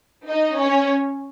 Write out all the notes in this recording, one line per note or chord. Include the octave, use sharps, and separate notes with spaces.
D#4 D#5
C#4 C#5